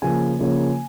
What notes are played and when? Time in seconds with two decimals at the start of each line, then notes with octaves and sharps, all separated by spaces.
0.02 C#3 F3 A#3 G#5
0.39 C#3 F3 A#3 C#4